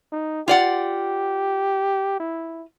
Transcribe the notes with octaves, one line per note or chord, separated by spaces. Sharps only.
D#4
F4 G4 D5 F#5
E4